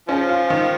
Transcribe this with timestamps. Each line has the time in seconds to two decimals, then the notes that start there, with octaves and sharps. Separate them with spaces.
0.09 C#3 F3 C#4
0.29 F4
0.50 D#3